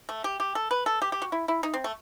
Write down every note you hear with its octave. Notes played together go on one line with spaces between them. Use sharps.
A3
G4
G4
A4
B4
A4
G4
G4
F#4
E4
E4
D#4
C4
A3